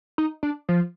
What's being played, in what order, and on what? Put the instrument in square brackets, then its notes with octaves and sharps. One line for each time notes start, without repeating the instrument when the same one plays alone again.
[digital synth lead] D#4
D4
F3